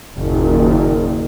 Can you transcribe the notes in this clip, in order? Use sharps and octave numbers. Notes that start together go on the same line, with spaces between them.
F#1 D#2 A#2